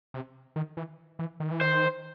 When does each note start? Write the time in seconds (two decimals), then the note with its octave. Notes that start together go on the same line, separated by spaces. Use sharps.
0.14 C3
0.56 D#3
0.77 E3
1.19 E3
1.40 D#3
1.51 E3
1.61 D#3 C5